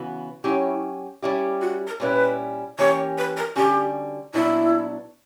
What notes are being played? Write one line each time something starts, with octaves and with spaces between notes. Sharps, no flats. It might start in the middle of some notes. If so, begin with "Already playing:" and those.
Already playing: C#3 E3 B3 F#4
F#3 C#4 E4 G4
G3 C#4 E4 G4
F#4
A#4
A#2 G3 C#4 E4 B4
E3 A#3 C#4 G4 C#5
B4
A#4
D3 G3 C#4 F#4 G4
A#2 F#3 B3 D4 E4